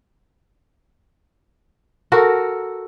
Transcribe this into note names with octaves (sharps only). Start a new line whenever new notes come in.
F#4 A4 A#4